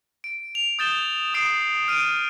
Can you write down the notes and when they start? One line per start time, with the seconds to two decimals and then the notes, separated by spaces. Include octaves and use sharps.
0.24 D7
0.55 F7
0.79 D#6 G6 A6 E7 G7
1.34 D#6 C7 D7
1.88 F6 D7 D#7